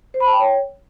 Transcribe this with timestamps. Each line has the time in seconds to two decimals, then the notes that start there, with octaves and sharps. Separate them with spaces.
0.14 C5
0.20 B5
0.27 A5
0.33 G5
0.40 C#5